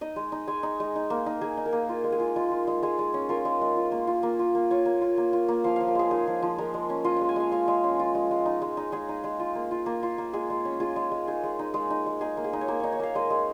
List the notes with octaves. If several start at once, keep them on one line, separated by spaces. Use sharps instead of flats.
D#4 D#5
G#3
D#4
G#3 G#5
D#4
G#3
D#4
A#3
D#4
A#3 G#4
D#4
A#4
A#3
F4
G#3
G#4
F4
G#3 F4
F4
G#3
G#3 G#4
G#3
C#4
F4 A#4
G#3
G#3
F4
A#3
F4
A#3
F4
A#3
F4 C#5
A#3
F4
A#3
F4
A#3
F3 F5
F3 F5
A#4
G#3 G#4
D#4 G#4
F3
F3
G#3 A#4
G#3
C#4
F4 D#5
G#3 F5
G#5
G#3 F5
G#3 F5
G#3
C#4
F4
G#3
G#3
D#4
G#3
D#4
G#3 G#4
D#4
G#3
F4
A#3
F4
A#3
F4
A#3
G#3 G#4
G#3
C#4
F4 G#4
G#3
G#3
D#4 G#4
G#3
D#4
G#3
D#4
G#3
D#4 G#4
A#3
G#4
D#4
C#5
A#3 A#4
D#4 C#5
C#5
A#3 F5
G#3 D#5
G#3